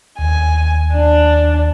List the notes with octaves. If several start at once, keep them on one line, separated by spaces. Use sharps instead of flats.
D#2 G#5
D4